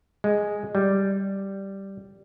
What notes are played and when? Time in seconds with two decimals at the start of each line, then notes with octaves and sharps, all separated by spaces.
0.24 G#3
0.75 G3